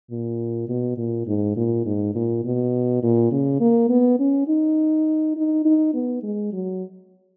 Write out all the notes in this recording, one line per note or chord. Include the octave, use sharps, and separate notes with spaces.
A#2
B2
A#2
G#2
A#2
G#2
A#2
B2
A#2
C#3
A#3
B3
C#4
D#4
D#4
D#4
B3
G#3
F#3